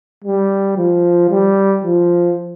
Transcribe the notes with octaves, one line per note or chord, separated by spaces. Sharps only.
G3
F3
G3
F3